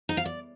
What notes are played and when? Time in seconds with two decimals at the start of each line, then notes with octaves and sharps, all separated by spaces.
0.09 D#4
0.17 F5
0.25 D5